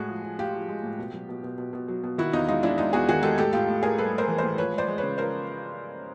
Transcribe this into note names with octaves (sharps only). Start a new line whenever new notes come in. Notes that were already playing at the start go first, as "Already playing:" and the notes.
Already playing: A2 G#3 F#4 G#4
F3
F3
A2 F4 G4
F3
G#3
A2
B2
F#3
B2
B2
B2
B2
F#3
B2
D#3 E4 F#4
E2 D#4 F4
G#3 D#4 F4
G#3 D4 E4
G#3 D#4 F4
E2 F#4 G#4
D#3 F#4 G#4
G#3 G4 A4
A2 G4 A4
A2 F4 G4
A2
A2 G#4 A#4
G3 A4 B4
A2 A#4 C5
E3
A#4 C5
A2
F3 B4 C#5
G#3
C5 D5
G#3
C#3 B4 C#5
F3 A#4 C5